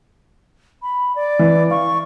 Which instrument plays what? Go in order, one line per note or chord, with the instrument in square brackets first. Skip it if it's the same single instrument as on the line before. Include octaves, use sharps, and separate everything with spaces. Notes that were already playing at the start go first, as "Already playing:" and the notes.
[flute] B5
D5
[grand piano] E3
[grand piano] F5 [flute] C#6